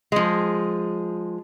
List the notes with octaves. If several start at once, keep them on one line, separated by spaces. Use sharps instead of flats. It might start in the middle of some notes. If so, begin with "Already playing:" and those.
F3 G#3